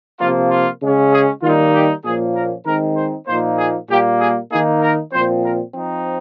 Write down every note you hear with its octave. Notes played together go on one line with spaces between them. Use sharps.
C3 F3 A#3 F4
F4
C#3 G#3 C#4
G#4
D#3 G3 A#3 D#4 F4
G4
A#2 F3 A#3 C#4 G#4
A#4
D#3 G#3 C4 D#4 A#4
C5
A#2 F3 A#3 D#4 C5
G#4
A#2 G3 A#3 G4
G#4
D#3 A#3 D#4 G#4
A#4
A#2 F3 C4 C5
A#4
F3 C4 D#4